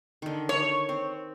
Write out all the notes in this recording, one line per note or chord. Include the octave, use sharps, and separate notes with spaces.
D3 D#3
C#5
C4